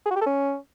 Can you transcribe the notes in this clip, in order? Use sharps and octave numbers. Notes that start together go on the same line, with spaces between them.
G#4
F#4
G4
A4
C#4